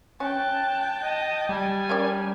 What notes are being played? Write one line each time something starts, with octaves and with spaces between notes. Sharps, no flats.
C#4 G5 A5 F#6
D#5
G3 G#5
C#4 A#4 D5